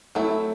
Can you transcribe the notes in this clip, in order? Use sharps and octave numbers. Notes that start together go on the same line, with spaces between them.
F#3 A3 C4 E4